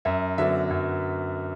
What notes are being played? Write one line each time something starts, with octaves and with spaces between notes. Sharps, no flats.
F#2 E5
D3 F#3 B3 D4 E5
F#2